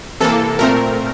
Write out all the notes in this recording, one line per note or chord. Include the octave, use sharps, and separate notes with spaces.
C3 E3 A#3 A4
A#2 A3 C4 A#4